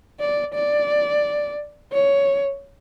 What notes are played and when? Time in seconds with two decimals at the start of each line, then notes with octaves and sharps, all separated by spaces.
0.20 D5
0.54 D5
1.92 C#5